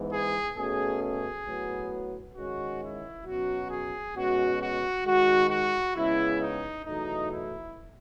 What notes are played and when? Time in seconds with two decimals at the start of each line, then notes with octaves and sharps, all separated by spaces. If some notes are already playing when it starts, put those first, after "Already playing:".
Already playing: G#2 E3 B3
0.11 G#4
0.56 B2 A3 C#4 G#4
1.02 G#4
1.46 A2 F#3 B3
2.36 G#2 D#3 G#3 C#4 F#4
2.81 E4
3.26 B2 F#3 C#4 F#4
3.71 G#4
4.15 B2 G#3 C#4 F#4
4.61 F#4
5.05 G#2 D#3 G#3 F#4
5.50 F#4
5.95 C#3 G#3 B3 E4
6.40 D#4
6.85 E2 B2 F#3 A3 D#4
7.30 E4